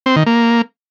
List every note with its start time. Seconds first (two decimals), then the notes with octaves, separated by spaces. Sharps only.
0.06 C4
0.16 D#3
0.26 A#3